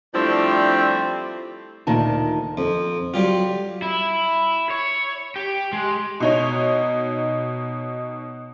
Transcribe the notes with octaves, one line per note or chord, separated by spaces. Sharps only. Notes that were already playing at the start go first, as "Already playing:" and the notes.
F3 G3 A3 C4 D4 E4
D2 A#2 D#3 A5
F2
F#3 G3 F4
E4
C#5
G4
G#3
B2 D#4 C#5